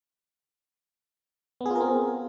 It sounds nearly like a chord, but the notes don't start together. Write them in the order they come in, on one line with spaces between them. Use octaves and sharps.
B3 G#4 F4 A#4 C4